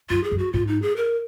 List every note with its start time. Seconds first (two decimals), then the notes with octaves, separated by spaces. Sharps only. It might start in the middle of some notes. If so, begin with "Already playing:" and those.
0.10 F#2 F4
0.24 G#4
0.31 F#2
0.39 F#4
0.53 G#2 F4
0.67 D#4
0.82 G#4
0.96 A#4